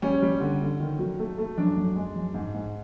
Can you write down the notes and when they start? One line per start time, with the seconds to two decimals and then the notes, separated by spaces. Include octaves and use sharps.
0.02 G3 C#4
0.22 G3
0.40 D3
0.61 D3
0.80 D#3
0.99 F#3
1.19 A3
1.38 A3
1.58 F#2 D4
1.77 F#2
1.96 G#3
2.15 F#2
2.34 G#2
2.54 G#2